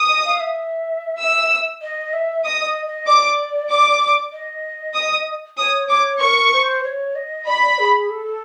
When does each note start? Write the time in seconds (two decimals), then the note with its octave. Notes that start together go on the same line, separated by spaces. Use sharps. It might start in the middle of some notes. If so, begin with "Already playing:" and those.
Already playing: D#6
0.09 D#5
0.25 F5
0.40 E5
1.19 E6
1.82 D#5
2.13 E5
2.45 D#5 D#6
2.65 D#5
2.86 D#5
3.07 D5 D6
3.70 D6
4.33 D#5
4.95 D#6
5.58 C#5 D#6
5.89 C#5 D6
6.21 A#4 C#6
6.53 C5
6.84 C#5
7.15 D#5
7.47 D5 B5
7.79 G#4
8.10 A4